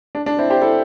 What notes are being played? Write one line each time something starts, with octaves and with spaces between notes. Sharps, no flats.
D4
D4
C4 E4
G4 C5
E4 A4